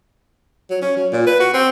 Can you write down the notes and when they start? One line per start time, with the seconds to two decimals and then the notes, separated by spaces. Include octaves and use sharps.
0.70 F#3
0.82 C#4
0.97 F#3
1.13 A#2
1.27 B4
1.40 F#4
1.54 C4